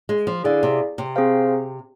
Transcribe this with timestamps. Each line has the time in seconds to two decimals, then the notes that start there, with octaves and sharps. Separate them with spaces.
0.09 G#3
0.27 F3
0.44 D3 E4 G#4 D5 F5
0.63 C3
0.98 C3
1.16 C4 G#4 C5 F5